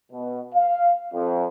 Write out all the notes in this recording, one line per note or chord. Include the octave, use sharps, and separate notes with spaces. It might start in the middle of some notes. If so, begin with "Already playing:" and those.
B2
F5
F2